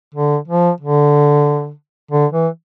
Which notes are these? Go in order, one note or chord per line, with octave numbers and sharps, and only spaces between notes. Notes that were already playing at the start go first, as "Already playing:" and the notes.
D3
F3
D3
D3
E3